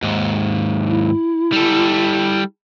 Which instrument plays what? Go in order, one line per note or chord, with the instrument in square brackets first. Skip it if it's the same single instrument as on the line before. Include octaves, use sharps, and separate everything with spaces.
[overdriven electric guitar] D#2 G#2
[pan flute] E4
[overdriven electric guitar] G3 A4